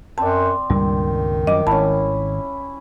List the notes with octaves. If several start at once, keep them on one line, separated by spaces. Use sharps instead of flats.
F#2 C4 D5 A5
C#2 G2 A#2 D#3 G3
F#2 F3 D#5 D6
G#1 C#4 E4 A5